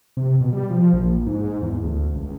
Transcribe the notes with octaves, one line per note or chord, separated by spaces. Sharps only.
C3
B2
G3
F3
A#1
G#2
G#2
E2
D2
C#2